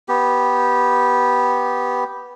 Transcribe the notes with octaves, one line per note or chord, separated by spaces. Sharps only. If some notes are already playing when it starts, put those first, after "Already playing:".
B3 G4